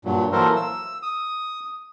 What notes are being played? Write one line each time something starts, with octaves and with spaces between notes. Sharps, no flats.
G2 A#2 F#3
E3 F#3 A#3 A4 A#4 C5
E6
D#6